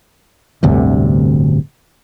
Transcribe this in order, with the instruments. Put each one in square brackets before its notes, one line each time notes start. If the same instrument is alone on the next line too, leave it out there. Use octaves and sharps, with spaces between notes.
[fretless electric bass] D1 G1 D2 C3